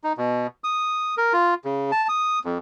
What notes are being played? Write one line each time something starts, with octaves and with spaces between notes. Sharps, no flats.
D#4
B2
D#6
A#4
F4
C#3
A5
D#6
F2